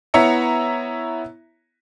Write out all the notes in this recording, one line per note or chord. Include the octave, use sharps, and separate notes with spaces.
B3 E4 C#5 E5 A#5 C#7